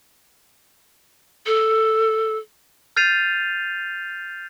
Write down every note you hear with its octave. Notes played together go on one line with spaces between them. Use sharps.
A4
F6 G6 A6 C7 D#7 F7